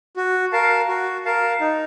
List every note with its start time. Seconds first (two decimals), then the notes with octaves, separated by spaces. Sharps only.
0.17 F#4
0.52 A#4 F5 A5
0.88 F#4
1.25 A#4 F5 A5
1.60 D#4